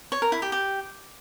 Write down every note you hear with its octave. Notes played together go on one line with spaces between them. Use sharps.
C#5
A#4
E4
G4
G4